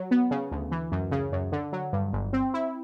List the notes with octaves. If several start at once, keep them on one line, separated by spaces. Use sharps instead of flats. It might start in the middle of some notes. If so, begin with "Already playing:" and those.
Already playing: F#3
B3
C#3
D2
E3
F#2
C#3
F#2
D3
F#3
G2
G1
C4
E4